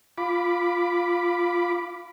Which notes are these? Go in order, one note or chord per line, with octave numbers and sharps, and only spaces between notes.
F4 B5 D6